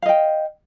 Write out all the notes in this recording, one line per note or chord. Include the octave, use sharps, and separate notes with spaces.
D#5 F5 G5